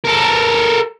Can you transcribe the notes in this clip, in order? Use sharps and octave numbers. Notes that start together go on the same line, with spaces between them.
A4 A#4